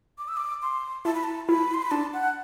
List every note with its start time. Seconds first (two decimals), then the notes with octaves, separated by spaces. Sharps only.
0.18 D6
0.28 E6
0.37 D6
0.62 C6
1.05 E4 A5
1.14 B5
1.24 A5
1.48 E4 B5
1.74 C6
1.82 B5
1.91 D4 A5
2.13 F#5